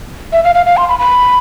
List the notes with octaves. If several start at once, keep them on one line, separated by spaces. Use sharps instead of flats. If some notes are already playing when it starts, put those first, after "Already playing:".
E5
F5
F5
F5
C6
B5
B5